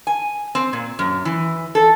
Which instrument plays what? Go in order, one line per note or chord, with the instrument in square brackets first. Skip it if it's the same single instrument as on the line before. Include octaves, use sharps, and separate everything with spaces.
[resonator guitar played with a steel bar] G#5
C4
A#2
F#2
E3
A4